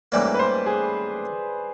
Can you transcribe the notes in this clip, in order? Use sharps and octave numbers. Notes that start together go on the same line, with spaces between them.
A1 G#2 E3 G3 A#3 D5
B4
C5
G#4